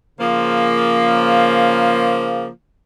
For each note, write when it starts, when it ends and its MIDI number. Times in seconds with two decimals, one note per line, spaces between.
0.19 2.47 49
0.19 2.47 53
0.19 2.47 58